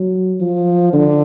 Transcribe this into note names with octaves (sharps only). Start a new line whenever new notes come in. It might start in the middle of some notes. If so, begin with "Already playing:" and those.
Already playing: F#3
F3
D3